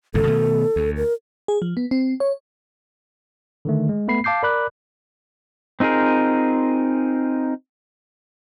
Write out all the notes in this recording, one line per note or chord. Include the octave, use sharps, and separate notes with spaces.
G#1 C#2 A2 A4
B2 D#3 A3
D2
A#4
G#4
F3
B3
C4
C#5
D3 D#3 A3
G#3
A3 B3 B5 C7
F5 A5 D6 G6 C7
A#4 D5 B5 D6 F#6
C4 D#4 F4 G#4 A#4